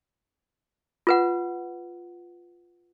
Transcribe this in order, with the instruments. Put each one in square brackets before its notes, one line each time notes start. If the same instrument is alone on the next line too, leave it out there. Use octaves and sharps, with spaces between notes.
[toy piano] F4 B4 F#5